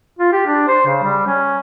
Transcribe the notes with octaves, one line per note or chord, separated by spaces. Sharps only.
F4
G4
D4
C5
C#3
G3
C#4